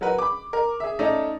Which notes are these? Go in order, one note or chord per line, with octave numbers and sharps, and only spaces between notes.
F#3 F#4 A#4 B4
B5 D6
A#4
G#4 E5
A3 C#4 D#4 D5 E5